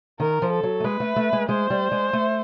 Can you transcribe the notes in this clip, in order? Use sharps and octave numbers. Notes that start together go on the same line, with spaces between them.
D#3 A#4
F3
A4
F#3
A3
G#3 B4
A3
A3
G#3
G#3 C5
G3
G#3
A3